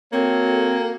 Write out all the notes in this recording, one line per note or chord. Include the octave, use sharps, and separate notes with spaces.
A#3 C4 F#4 A4 C#5